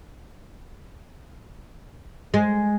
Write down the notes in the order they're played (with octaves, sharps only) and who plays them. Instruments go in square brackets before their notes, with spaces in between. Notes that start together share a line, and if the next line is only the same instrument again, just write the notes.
[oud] G#3